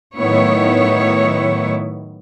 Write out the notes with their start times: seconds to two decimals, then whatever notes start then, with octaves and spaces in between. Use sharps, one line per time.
0.17 A2 D#3 F#3 B3 E4 C#5